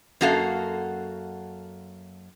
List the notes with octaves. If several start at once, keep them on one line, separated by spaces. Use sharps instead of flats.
F#2 A#3 F#4 A4 F5